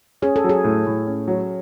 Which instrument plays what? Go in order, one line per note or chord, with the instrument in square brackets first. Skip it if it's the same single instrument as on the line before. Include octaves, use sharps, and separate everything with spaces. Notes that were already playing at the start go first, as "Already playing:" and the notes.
[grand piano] C#4 [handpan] G#4
[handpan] A4
[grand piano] F#3
[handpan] G#4
[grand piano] A2
A2
C#4
F#3